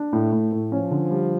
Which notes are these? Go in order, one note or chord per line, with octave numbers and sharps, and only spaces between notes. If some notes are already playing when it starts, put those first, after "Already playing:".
Already playing: D4
A2 A3
A2
A2
F3 C#4
D3
G3